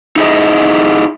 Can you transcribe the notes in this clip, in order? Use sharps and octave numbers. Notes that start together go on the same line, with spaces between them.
D#4 E4 G#4 D#5